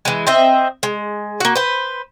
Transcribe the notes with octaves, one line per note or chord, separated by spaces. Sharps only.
E3 G#3
C4 C5 D#5 E5
G#3
A#3 F#4
B4 C5